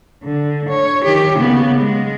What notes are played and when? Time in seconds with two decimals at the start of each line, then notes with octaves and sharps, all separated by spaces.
0.24 D3
0.69 C#5
1.04 D#3 G4
1.38 C#3 B3
1.81 G#3